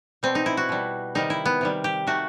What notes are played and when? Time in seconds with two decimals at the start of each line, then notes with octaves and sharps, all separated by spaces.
0.23 B2 G3 C4
0.35 D#4
0.46 E4
0.57 F#4
0.69 B2 G3
1.15 C3 D#3 G3 D#4
1.30 E4
1.46 B3
1.61 C3 D#3 G3
1.84 G4
2.07 D#3 A3 F#4